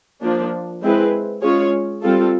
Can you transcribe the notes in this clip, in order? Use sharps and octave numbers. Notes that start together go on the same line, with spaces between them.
F3 A#3 D4
G#3 C4 E4 G#4 B4
G#3 C#4 F4 G#4 C#5
G3 C4 F4 A4